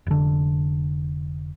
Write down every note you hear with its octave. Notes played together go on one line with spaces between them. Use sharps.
F1 D3